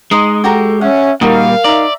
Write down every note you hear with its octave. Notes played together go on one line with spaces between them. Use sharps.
G#3 D#4 D#5 C6
F#4 G4 A4 A#5
C#4 E5 F#5
A#2 G3 A#3 D#4 F#4 A#4 F5
D#4 D5 E5 A#5